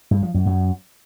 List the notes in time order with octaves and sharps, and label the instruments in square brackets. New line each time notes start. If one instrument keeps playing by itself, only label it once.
[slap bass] G2
F3
F#2
F#2